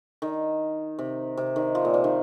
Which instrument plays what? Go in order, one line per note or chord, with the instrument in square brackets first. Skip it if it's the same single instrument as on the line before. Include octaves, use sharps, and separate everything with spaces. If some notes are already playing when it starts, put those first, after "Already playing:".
[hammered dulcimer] D#3
C3
C3
D#3
F3
A#2
C3
D#3